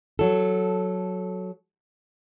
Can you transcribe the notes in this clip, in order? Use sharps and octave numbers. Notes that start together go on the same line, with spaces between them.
F#3 A4